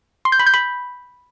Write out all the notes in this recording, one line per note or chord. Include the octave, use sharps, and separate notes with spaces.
C6
G6
B5
G6
B5